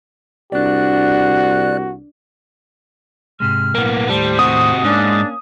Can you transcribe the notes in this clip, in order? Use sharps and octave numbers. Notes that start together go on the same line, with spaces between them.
C2 D4 F#4 D5 F#6
G#2 C3 G#3 F6
B1 A2 A#3 B3
D#2 A2 G3 A4 C5
C3 F#4 D#6
G#2 A#3 C#4 D4